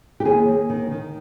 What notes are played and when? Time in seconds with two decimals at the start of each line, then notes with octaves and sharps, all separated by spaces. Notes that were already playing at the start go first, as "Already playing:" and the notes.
0.20 G4
0.25 D#2 G#4
0.48 D#2
0.70 D#3
0.91 D#3